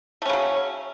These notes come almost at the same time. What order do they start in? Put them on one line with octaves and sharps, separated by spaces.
A3 C#4 C#3 F#3